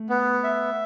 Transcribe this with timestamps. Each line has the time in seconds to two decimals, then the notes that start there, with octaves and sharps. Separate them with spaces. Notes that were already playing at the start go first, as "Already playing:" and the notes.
Already playing: A3
0.09 B3
0.44 E5